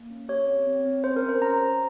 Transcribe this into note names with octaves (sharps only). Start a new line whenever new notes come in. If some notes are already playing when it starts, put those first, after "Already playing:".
Already playing: A#3
C#4
G4 C#5
C4
C4
C4
C#4 C5
A#4
C#4
C5
C#4 A#5
G4